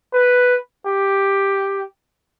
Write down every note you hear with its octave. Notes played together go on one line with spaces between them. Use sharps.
B4
G4